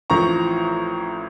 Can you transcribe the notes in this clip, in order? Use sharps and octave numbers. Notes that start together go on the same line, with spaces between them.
A1 A2 F3 C4 A#5 C#6